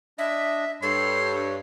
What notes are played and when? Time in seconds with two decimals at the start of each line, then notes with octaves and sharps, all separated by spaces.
0.18 D4 D#5 E5
0.82 G2 A4 C#5 C6